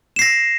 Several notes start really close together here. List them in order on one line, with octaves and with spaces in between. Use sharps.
E7 C7 A#6